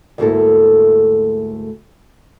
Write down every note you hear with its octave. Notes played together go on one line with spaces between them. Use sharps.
D2 G#2 A3 A#3 E4 A4